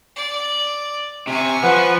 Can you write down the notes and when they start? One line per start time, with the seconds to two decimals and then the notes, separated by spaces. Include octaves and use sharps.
0.16 D5
1.27 C3 G#5 C#6
1.63 F3 B4 F#5